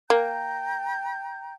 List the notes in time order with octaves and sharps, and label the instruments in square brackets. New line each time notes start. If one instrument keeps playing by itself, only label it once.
[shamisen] A#3 [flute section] G5 A#5 G6